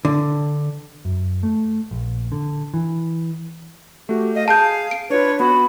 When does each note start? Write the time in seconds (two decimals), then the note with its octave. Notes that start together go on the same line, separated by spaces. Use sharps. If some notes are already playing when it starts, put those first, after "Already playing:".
0.05 D3
1.05 F#2
1.43 A3
1.91 A#1
2.32 D3
2.74 E3
4.09 A3 F#4 G4
4.35 D#5 F5
4.48 G#4 F5 A5 G6 D#7
4.91 D7
5.10 D4 F4 B4 C#5
5.40 B3 F#4 B5